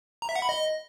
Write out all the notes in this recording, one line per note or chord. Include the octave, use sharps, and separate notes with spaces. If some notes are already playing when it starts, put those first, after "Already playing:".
A#5
E5
F#5
B5
D#5